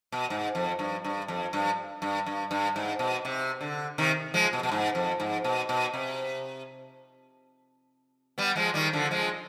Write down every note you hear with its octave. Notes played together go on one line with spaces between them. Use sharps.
B2
G#2
F2
G2
G2
F2
G2
G2
G2
G2
G#2
B2
C3
D3
C3 D#3
F3 G#3
B2
B2
G#2
F2
G#2
B2
B2
C3
G3 B3
F3 G#3
D#3 G3
D3 F3
F3 G#3